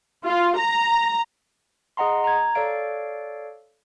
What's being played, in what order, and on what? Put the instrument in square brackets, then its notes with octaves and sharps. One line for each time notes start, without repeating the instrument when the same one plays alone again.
[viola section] F4
A#5
[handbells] G#4 D#5 F#5 A#5 C6
A#5 G#6
A4 C#5 D5 F5 D7